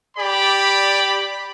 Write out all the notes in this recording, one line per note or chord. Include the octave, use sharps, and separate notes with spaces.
G4 D5 B5